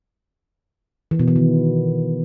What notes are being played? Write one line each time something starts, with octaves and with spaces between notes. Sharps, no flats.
E3
B2
E3
D#3